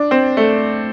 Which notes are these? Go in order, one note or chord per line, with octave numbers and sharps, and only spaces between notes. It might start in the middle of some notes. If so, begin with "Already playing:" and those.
Already playing: D4
C4
A3